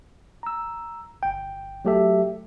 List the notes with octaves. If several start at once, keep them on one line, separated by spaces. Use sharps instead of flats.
A#5 E6
G1 G5
F#3 A3 G4 A4 E5